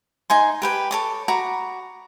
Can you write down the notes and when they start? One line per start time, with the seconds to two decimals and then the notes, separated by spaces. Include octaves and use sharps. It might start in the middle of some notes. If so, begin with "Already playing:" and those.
0.30 D#4 G#5 C6
0.62 G4 B4 G5
0.91 A4 C#5 D6
1.28 F#4 A#5 B5 D6